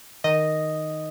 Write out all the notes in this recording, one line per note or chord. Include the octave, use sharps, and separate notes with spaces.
D#3 D#5